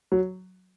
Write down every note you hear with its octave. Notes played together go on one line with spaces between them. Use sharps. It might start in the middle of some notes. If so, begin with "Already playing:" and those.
F#3